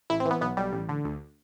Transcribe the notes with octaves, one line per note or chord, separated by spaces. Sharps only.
A1 E4
C4
E3
B3
B1 B3
B1 G3
A1
D3
D2